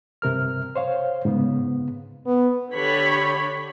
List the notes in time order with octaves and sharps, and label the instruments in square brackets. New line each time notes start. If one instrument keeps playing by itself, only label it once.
[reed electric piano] G2 C3 A#4 F6
C5 C#5 F5
G#2 C#3 B3
[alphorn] B3
[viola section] D3 G4 C#5 B5